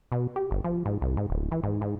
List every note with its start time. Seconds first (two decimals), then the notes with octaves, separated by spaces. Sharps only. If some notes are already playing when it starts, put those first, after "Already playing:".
0.12 B2
0.36 G4
0.51 G1
0.64 F3
0.86 G#2
1.01 C2
1.17 G#2
1.30 D1
1.52 E3
1.63 G#2
1.81 G#2